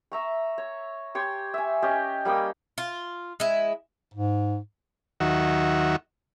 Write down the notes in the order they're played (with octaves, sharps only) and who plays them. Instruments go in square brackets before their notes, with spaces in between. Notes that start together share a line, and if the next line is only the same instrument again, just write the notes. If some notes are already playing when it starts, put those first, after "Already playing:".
[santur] E5 A#5 C#6
C#5
G4 C#5 C6
E5 G#5
C#4 G4 D#5
G3 A#3 G5 D#6
[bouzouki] F4
G#3 E4
[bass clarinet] G#2
[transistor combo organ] D#2 D#3 F#3 F#4 E5